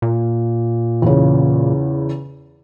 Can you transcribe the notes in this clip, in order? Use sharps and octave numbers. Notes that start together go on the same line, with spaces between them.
A#2
E2 C#3